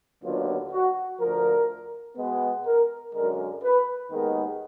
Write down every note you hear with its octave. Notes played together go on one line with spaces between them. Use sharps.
D#2 D3 F#3 B3 F4
F#4
D2 D3 F3 A#4
B2 G#3 B3
A#4
F#2 D3 G#3 A#4
B4
D#2 D#3 G#3 B3 A#4